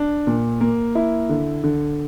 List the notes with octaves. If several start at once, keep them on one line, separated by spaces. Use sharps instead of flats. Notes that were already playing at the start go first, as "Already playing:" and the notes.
Already playing: D4
A#2
A#3
E4
D3
D3